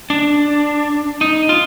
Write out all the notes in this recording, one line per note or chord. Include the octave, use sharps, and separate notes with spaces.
D4
D#4
F4